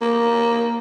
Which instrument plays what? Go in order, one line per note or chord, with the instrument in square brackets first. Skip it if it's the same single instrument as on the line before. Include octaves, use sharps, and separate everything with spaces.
[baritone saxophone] A#3